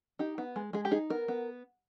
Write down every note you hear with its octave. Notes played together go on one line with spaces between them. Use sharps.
D#4 G4
B3
G#3
G#3 G#4
G4
D#4 G#4
B3 A#4
B3